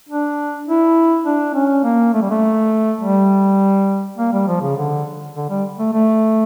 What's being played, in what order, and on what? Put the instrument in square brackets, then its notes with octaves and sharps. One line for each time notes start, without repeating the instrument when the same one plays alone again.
[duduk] D4
E4
D4
C#4
A#3
A3
G3
A3
G3
A#3
G3
F3
C#3
D3
D3
G3
A3
A3